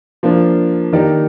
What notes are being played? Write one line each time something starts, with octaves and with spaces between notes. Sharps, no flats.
F3 A#3 D4
D#3 A#3 D#4 G4 D5